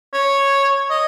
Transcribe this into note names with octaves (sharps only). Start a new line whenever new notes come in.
C#5
D#5